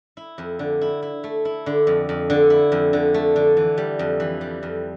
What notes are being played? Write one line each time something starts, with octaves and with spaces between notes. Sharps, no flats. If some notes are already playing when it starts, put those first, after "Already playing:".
E4
F2
D3
E4
E4
A3
E4
D3
F2
F2
D3
E4
F2
D3
A3
D3
E3
G3
F2
E3
G3
F2